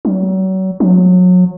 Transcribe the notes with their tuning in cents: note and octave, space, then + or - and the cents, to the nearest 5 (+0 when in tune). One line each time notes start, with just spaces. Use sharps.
F#3 +35
F#3 -30